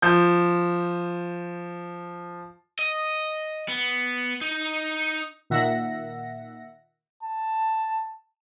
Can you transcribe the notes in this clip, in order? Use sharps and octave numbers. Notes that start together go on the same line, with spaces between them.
F3 G6
D#5
B3
D#4
A#2 D#3 E5 F#5 A#6
A5